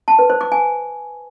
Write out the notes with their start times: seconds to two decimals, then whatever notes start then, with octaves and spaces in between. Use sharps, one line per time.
0.08 A5
0.19 B4
0.30 C5
0.41 D6
0.52 G#5